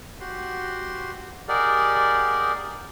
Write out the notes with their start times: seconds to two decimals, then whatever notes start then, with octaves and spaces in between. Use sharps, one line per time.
0.20 F#4 G4 F#5 C6
1.48 G4 G#4 A#4 D5 D#5 F#5